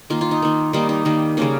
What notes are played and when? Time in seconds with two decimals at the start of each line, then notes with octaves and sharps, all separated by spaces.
0.10 D#3 A#3 F4
0.21 F4
0.31 D#4
0.42 D#3 A#3
0.73 D#3 G3 A#3 D#4
0.89 D#4
1.05 D#3 G3 A#3
1.37 C#3 G3 A#3 C#4